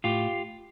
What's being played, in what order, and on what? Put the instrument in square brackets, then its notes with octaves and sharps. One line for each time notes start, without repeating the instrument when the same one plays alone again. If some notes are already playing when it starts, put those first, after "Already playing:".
[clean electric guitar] A2 F4 G4